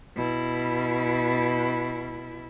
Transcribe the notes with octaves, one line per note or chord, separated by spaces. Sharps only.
B2 E4